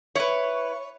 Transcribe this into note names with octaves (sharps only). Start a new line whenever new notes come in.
E4 B4 C#5